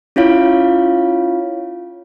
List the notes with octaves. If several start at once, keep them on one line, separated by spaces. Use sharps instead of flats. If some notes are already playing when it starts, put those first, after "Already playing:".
C#4 E4 F4 C#5 F5